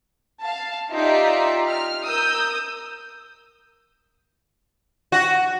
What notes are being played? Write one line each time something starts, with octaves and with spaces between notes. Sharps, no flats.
F5 A5
D#4 F4 G4 D5 E5
F6
A#4 D#6 E6 G6
F#4